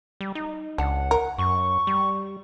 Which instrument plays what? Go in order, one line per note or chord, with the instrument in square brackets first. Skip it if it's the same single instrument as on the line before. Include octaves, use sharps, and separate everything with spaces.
[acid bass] G3
D#4
[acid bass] C#2 [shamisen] D4 [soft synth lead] F#5
[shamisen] A#4
[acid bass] F#2 [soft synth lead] C#6
[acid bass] G3